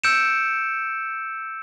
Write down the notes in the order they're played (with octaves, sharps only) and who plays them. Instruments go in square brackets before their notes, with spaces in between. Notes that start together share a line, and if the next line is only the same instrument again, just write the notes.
[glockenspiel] E6 G6 C#7 D7 E7